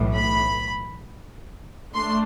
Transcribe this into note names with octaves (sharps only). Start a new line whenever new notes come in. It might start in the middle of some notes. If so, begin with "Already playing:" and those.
Already playing: B1 A2 E3
B5
A3 D4 C6